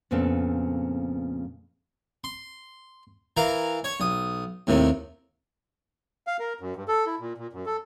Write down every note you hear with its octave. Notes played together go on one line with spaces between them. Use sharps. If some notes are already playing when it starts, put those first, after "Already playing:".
F2 A#2 C#3 B3 C4 A4
C6
E3 A#4 F5 A#5
C#5
B1 D#6
D#2 A2 C3 D#3
F5
A#4
F#2
G2
A4
E4
A#2
A#2
F#2
A4